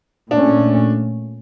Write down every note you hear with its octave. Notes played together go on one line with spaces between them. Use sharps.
A#2 A3 C#4 D4